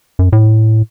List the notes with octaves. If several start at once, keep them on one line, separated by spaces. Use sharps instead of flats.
F#2
A2